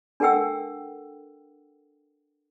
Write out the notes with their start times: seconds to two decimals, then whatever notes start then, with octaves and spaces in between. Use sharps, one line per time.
0.20 D4 A4 A#4 F#5 G5 E6